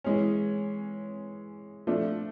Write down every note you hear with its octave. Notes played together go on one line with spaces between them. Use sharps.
E3 G#3 C#4
F3 A3 D4